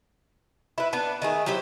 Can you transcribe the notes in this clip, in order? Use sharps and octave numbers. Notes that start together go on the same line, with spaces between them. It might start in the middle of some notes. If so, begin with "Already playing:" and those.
E4 B4
B3 D4 B4
D#3 A3 G#4
F#3 E4 G4 C5